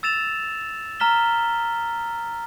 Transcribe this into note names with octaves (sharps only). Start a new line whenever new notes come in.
E6 A6 E7 F7
A#5 F6 B6 G7